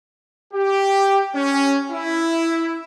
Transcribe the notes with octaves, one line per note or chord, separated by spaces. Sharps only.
G4
C#4
E4